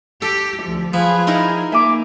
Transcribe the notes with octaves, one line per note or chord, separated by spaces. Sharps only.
G4 A4
D2 F3
F3 F4 G#4 B4
D#4 E4 A#4
A#3 E5 G#5 D6